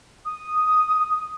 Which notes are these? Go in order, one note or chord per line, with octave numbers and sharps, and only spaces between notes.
D#6